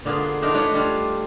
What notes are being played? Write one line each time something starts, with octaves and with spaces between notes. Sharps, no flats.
D3 A#3 B3 F4 G#4
A3 D4 D#4 F4 A#4
D4 B4 C#5 D#5
G3 D4 F4